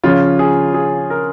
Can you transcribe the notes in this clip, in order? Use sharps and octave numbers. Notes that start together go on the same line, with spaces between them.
C#3 F3 C#4 F4
G#4
G#4
A#4